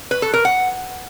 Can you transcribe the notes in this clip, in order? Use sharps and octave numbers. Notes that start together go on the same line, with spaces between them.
B4
A4
A#4
F#5